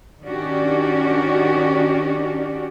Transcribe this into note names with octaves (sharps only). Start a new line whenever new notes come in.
D#3 C#4 D4 F#4 G4 D5